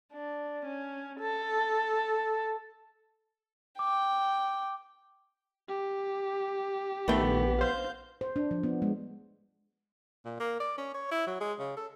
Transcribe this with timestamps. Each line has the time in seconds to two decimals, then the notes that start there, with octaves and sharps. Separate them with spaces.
0.13 D4
0.65 C#4
1.20 A4
3.79 G5 D6
5.68 G4
7.08 A#1 D#3 A3 B3 G5
7.61 C5 F5 G6
8.21 C5
8.36 D4
8.51 F3
8.63 B3
8.82 G#3
10.25 A#2
10.40 A#3
10.60 D5
10.78 C#4
10.94 C#5
11.11 E4
11.27 F#3
11.41 G#3
11.59 C#3
11.77 A4